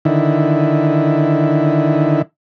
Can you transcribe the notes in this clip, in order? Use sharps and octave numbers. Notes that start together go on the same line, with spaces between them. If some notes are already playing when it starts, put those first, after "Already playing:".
D3 D#3 E4